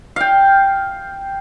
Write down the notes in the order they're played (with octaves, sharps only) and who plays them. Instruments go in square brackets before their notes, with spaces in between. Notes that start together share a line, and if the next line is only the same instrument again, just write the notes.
[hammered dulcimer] F5 G5